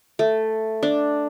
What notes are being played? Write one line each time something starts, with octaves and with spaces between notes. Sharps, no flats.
A3
D4